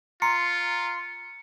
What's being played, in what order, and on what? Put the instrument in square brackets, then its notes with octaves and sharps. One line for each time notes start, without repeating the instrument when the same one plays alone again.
[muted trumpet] F4 [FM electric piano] A#5 C6 [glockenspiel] C#7